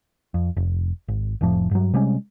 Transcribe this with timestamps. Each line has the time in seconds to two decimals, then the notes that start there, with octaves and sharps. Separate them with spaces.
0.34 F2
0.57 F1
1.08 G#1
1.41 F1 F2 A2 F3
1.71 G2 F#3
1.93 C3 G3 G#3 C#4